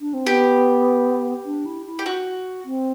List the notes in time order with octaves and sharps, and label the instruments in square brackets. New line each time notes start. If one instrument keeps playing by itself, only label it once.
[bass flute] D4
C4
[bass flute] B3 [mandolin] G4
[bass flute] D4
E4
E4
[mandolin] G4
F#4
[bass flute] C4